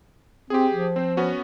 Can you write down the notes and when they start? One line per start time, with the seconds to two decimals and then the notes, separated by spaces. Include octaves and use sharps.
0.50 C4 G4 G#4
0.74 F3
0.96 C4 C5
1.17 B3 C#4 F#4